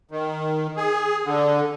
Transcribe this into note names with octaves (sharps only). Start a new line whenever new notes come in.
D#3
G#4
D3